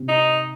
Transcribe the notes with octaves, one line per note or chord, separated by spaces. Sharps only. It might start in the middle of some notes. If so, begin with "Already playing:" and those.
Already playing: C3
D#4